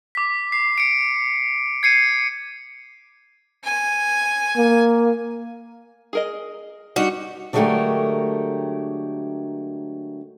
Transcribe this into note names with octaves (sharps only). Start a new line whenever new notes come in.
D6 B6
C7
C#7 D7
G#6 C7 C#7 D#7
G#5
A#3
G#4 A#4 D#5
G3 D4 D#4 F#4
D3 F#3 G#3 A3 G4 A#4